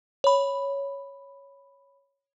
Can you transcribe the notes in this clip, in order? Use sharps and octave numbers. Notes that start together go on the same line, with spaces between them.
C#5 B5